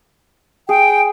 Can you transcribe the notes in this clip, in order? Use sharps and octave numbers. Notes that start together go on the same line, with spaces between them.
G#4 G5